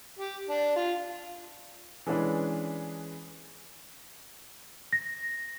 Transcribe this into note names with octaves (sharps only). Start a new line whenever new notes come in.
G4
D4
F4
E3 G#3 C#4 D4 G#4 B4
A#6